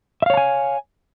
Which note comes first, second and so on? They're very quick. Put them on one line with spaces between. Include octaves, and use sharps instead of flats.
E5 F5 C#5 A5 G#5